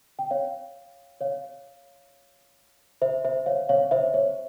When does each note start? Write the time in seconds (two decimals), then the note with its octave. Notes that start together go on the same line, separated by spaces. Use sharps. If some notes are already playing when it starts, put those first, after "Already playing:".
0.19 G5
0.31 C#5 F5
1.21 C#5 F5
3.02 C5 E5
3.25 C5 E5
3.46 C#5 F5
3.69 C#5 F5
3.91 C5 E5
4.14 C#5